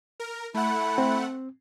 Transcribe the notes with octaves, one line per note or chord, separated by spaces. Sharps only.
A#4
A3 E4 F#5
C4